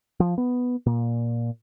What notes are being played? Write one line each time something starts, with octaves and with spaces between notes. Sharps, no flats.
F3
B3
A#2